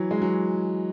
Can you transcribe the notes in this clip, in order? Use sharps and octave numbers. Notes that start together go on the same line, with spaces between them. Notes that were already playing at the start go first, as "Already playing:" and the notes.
Already playing: E3 F#3
G#3
F#3